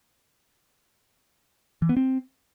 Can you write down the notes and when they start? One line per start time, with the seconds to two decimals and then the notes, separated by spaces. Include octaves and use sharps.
1.82 E3
1.89 B3
1.97 C4